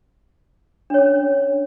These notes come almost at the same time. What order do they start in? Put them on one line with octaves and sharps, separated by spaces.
D4 C#5 C#4